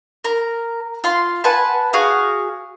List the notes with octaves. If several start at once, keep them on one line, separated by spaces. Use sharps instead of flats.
A#4 A#5
F4 C6
B4 F#5 G#5 A5
F#4 G#4 F5 D#6